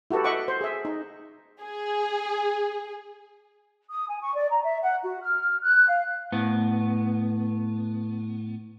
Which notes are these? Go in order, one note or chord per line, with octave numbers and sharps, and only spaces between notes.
E4 F#4 G4 A4 B4
D#5 E5 F#5 C#6 D6
C5
G#4 E5
D#4
G#4
D#6
G#5
C#6
D5
A#5
E5
F#5
F#4
F6
F#6
F5
A2 B3